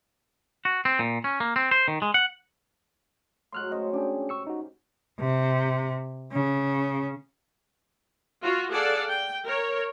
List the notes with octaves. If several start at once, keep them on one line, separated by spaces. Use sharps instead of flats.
F#4
C4
A#2
C#4
A#3
C4
C5
D#3
G#3
F#5
A2 F#3 G#3 C6 F6 F#6
C#4 C5 D#5
C#4 D4 G4 G#4
C#6 E6 C#7
D#4 F#4
C3
C#3
F4 F#4
G#4 A4 D5 F5 F#5 A5
G5
A#4 C#5